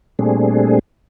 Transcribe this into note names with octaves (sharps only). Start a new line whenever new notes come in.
A#2 G3 A3 C4 D4 G#4